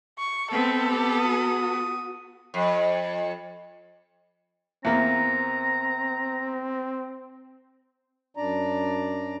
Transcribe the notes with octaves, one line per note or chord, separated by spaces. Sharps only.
C#6
B3 C4 A4 E5
G4
F#4 D#6
F2
E2 A#3 C4 A#5
F#2 D4 D5 A#5